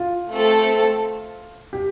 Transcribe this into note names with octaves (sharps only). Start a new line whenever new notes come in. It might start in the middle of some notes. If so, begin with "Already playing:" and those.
Already playing: F4
A3 C4 A4
G4